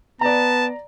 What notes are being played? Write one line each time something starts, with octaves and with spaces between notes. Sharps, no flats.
B3 D5 A5 A#5